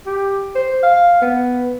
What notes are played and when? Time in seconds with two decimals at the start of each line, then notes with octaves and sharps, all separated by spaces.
0.07 G4
0.55 C5
0.83 F5
1.22 B3